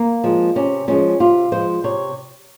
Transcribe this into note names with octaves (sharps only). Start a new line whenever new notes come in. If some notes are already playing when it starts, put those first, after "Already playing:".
Already playing: A#3
F3 G#3
C3 C#4
F3 G#3 C#4
C3 F4
F3 G#3 C5
C3 C#5